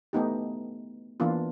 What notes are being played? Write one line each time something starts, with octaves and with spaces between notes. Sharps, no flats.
A3 B3 D#4 G4
E3 A#3 B3 D4 F4